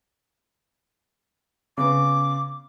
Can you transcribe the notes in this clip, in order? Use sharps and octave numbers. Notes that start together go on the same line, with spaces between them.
C#3 B3 C#4 D6